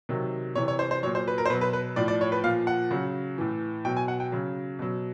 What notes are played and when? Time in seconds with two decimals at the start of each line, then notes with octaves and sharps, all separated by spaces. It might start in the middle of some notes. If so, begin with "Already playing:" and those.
0.09 C3 D#3 F#3
0.55 C3 E3 C#5
0.68 C#5
0.79 C5
0.91 C5
1.03 F#3 C#5
1.06 A#2
1.15 C5
1.28 B4
1.38 A#4
1.46 C5
1.50 B2 B4
1.53 F#3
1.61 B4
1.73 B4
1.96 A2 F3 D5
2.08 D5
2.21 C#5
2.32 B4
2.44 A#2 F3 F5
2.67 F#5
2.91 C#3 F#3
3.38 A2 E3
3.85 B2 F#3 G5
3.97 G#5
4.08 F#5
4.20 G5
4.32 C#3 F#3
4.79 B2 F#3